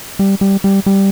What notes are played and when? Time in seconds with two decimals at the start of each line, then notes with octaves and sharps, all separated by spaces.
0.19 G3
0.41 G3
0.64 G3
0.86 G3